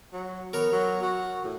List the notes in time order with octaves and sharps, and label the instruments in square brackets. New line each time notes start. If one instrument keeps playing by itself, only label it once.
[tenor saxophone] F#3
[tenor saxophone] B3 [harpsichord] A#4 C#5
[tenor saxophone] F#3
F#4
A2